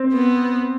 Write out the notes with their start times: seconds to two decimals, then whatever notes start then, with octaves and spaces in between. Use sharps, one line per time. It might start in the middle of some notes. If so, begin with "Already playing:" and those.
Already playing: C4
0.12 B3